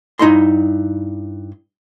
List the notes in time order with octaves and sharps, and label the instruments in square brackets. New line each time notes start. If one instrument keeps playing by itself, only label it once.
[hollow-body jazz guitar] G2 D#4 E4 D#5 C6